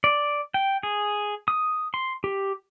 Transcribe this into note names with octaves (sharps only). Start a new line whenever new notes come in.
D5
G5
G#4
D#6
C6
G4